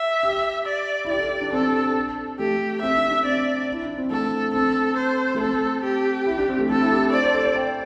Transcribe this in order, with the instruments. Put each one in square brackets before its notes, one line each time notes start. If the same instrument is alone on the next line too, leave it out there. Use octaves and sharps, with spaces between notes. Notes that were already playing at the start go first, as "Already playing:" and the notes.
Already playing: [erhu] E5
[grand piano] G4
[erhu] D5
[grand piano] E4
[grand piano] G4 [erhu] D5
[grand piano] A4
G4
D4
[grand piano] C4 [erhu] A4
[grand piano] A3 [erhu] G4
[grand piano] C4 [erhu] E5
[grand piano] D4
D4
[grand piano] C4 [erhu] D5
[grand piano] E4
D4
C4
[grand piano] A3 [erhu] A4
[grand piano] C4 [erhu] A4
[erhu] C5
[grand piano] A3
[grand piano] C4 [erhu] A4
[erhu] G4
[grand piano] E4
D4
C4
A3
[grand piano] C4 [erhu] A4
[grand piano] E4
G4
[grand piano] C5 [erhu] D5
[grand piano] C5
A4
C5
G5